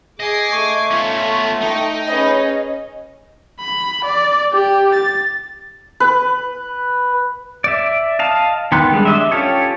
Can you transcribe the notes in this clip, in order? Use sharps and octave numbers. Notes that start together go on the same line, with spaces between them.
G#4 D#5 D6 G#6 C7
A3 C#6
B3 C#4 F4
D#4 G5
C#4 G#4 B4 D#5
B5
D5
G4
A6
B4
D5 E5
D#5 F5 A5
D#3 B3 G5 C6 F#6
G3 G#3 D4
D4 D#5 E5
C#4 F4 G4 A4 C#5